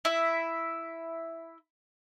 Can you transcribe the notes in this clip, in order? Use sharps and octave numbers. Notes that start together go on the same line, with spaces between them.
E4 E5